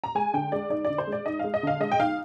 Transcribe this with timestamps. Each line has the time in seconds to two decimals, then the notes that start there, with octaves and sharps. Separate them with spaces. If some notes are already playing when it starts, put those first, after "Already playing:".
0.04 A#5
0.15 G#3 G#5
0.34 D3 G5
0.52 G#3 D5
0.70 D#4 D5
0.85 D3 D5
0.98 C5
1.07 G#3
1.12 D5
1.26 D#4 D#5
1.39 G#3 F5
1.54 D#5
1.63 D3 F5
1.80 G#3 D#5
1.92 G5
2.00 D#4 F5